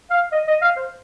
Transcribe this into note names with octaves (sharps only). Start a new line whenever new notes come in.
F5
D#5
D#5
F5
C5